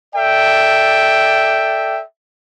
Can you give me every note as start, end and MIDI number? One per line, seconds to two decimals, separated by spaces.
0.15 2.00 69
0.15 2.00 74
0.15 2.00 76
0.15 2.00 79